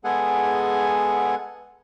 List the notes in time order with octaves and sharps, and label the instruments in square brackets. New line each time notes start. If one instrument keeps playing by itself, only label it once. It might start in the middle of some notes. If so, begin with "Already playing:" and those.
[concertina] G#3 B3 G#4 A4 F#5 G#5